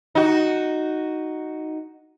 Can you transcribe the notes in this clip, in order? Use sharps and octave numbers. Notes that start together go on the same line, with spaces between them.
D#4 F#4